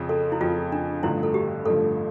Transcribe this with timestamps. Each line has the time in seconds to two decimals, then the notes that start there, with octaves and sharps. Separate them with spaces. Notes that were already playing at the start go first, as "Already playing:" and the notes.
Already playing: F2 C#3 F3
0.09 A4
0.32 E4
0.41 F2 C#3 F3 F4
0.72 D4
1.03 A1 G2 D3 F3 E4
1.23 A4
1.34 G4
1.65 A1 G2 D3 F3 A4